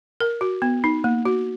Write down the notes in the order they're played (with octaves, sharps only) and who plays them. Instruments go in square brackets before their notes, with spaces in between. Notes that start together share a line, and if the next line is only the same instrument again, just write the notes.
[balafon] A#4
F#4
B3
D#4
A#3
F#4